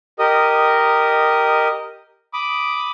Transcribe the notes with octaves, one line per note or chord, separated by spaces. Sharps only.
G4 A#4 D#5 D#6
B5 D6 D#6